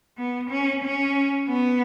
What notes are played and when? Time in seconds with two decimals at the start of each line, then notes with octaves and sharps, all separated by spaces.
0.17 B3
0.50 C#4
0.84 C#4
1.48 B3